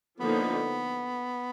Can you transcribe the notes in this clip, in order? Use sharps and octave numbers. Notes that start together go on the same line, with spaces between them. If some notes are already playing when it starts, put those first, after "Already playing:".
D3 F3 A#3 B3 D#4